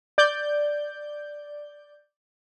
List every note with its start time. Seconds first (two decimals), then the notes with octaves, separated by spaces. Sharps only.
0.18 D5 G6